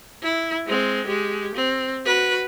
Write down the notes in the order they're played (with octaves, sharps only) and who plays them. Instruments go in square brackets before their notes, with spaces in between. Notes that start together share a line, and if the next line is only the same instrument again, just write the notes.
[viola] E4
G#3 C4
G#3 G4
C4
F#4 B4